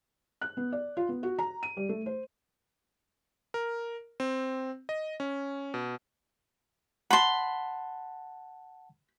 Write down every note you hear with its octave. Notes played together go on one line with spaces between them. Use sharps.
F#6
B3
D5
F4
B3
F#4
A#5
D#7
G3
A3
C5
A#4
C4
D#5
C#4
B2
F#5 A5 B5 C6